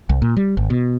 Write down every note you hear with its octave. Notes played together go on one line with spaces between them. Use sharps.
C2
A#2
G3
G#1
B2